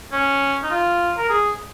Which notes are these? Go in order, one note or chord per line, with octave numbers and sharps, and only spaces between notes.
C#4
D#4
F4
A#4
G#4